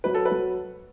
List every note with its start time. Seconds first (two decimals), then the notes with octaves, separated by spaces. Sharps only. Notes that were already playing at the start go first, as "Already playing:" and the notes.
0.04 F#3 B4
0.14 A4
0.25 F#3 B4